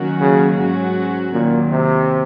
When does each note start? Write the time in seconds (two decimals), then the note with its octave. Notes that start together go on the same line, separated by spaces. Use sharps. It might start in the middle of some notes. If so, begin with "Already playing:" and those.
Already playing: D#3 F#3 A#3 C#4 F#4
0.20 C#3
0.58 G#2 F#3 C#4 F#4
1.33 D#2 A#2 D#3 F#3
1.72 C3